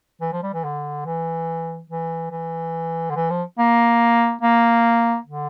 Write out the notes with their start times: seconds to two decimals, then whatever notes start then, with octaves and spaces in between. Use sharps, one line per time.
0.21 E3
0.33 F3
0.43 G3
0.54 E3
0.64 D3
1.05 E3
1.90 E3
2.31 E3
3.10 D3
3.16 E3
3.30 F3
3.59 A#3
4.42 A#3
5.26 D3